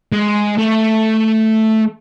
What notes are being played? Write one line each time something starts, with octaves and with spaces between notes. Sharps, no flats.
G#3
A3